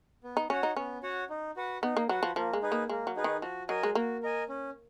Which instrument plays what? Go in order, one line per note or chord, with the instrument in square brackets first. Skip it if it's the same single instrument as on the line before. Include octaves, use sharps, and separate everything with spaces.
[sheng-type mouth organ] B3
[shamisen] D#4
[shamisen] C#4 [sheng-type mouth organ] F#4 C#5 F#5
[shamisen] D#4
[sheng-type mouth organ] B3 [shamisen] C#4
[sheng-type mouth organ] F#4 C#5 F#5
D#4
F#4 B4 F#5
[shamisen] B3 [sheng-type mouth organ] D#4
[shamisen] A#3
[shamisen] F#3 [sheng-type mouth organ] F#4 B4 F#5
[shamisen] F3
[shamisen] F3 [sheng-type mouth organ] A#3
[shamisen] G#3
[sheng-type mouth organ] D#4 G#4 B4
[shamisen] A#3
[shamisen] G#3 [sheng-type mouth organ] A#3
[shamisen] F#3
[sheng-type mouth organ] D#4 G#4 B4
[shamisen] D#3
[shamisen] F3 [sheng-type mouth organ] F#4
[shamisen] F#3 [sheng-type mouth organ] A#4 D#5 G#5
[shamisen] G#3
[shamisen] A#3 [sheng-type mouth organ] F#4
[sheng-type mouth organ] A#4 D#5 G#5
C#4